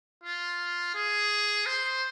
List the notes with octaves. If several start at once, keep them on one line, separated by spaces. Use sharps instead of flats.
F4
G#4
C5